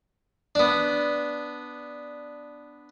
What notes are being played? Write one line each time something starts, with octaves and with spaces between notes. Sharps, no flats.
B3 D4